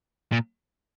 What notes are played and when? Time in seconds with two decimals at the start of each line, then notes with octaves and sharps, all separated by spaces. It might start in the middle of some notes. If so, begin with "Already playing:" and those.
0.32 A#2